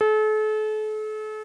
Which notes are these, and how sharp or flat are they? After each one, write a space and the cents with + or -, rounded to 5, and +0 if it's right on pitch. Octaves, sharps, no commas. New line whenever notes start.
A4 -40